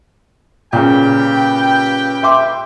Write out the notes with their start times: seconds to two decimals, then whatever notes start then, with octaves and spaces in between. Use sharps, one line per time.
0.73 A#2 C#3 G4 B4 G5
2.23 E5 C6 D6